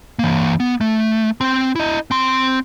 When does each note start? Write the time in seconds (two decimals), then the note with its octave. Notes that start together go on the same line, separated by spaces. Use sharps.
0.19 E3 A#3
0.60 B3
0.81 A3
1.41 C4 C6
1.76 E4 D#5
2.11 C4 C6